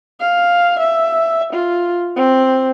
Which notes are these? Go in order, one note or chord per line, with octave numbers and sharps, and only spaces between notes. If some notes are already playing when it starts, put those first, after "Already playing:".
F5
E5
F4
C4